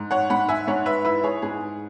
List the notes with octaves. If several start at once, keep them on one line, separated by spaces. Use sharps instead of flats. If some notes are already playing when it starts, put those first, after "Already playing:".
Already playing: G#2
C#5 F#5
G#2 F#5 B5
E5 G#5
G#2 C#5 F#5
B4 E5
E4 B4 E5
G#4 C#5
G#2 G#4